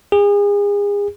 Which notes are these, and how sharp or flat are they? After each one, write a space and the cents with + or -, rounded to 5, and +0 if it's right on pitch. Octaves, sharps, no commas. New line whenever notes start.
G#4 -35